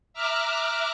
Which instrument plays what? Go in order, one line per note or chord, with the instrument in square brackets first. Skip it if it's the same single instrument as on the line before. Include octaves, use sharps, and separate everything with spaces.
[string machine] E5 A#5 D6 F6 F#6